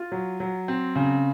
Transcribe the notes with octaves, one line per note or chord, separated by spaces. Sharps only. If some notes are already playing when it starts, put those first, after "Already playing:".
Already playing: F4
F#3
F#3
C4
C#3